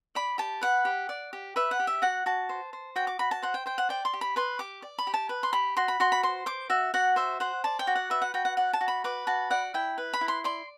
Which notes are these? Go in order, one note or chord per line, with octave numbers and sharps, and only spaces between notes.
D5 B5
G4 A5
B4 F#5
G4
D5
G4
B4 E5
F#5
G4
E5
F#4 F#5
F#4 A5
C5
C5
F#4 G5
D6
F#4 B5
A5
C5 F#5
G5
C5 G5
F#5
D5 G5
C6
G4
B5
B4 C6
G4 D6
D5
B5
G4
A5
B4
C6
G4 B5
F#4 C6
B5
F#4 C6
B5
C5 C6
C5 D6
F#4 E5
F#4 F#5
C5 E5
C5 F#5
D5 A5
G5
F#4
F#5
B4 E5
F#5
F#4 G5
F#5
D5 F#5
A5
F#4
B5
B4 D6
F#4 A5
D5 F#5
E4 G5
B4
B5
E4
C6
D5 C6